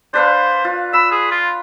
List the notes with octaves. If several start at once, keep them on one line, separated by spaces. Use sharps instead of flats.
D4 B4 C5 F5
F4
B5 E6
G#4
F4